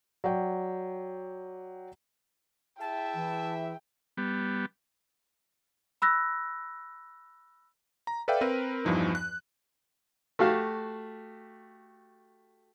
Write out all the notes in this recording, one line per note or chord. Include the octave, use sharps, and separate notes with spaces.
F#3 D5 G5
E4 G#4 E5 G5 A5
E3
G3 B3
B5 E6 F#6 A#6
A#5
A4 B4 D5 E5 F5 G5
C4 A#4 B4 D#7
E2 G2 E3 F3 D#4
F#6
A3 F#4 G4 F5 A5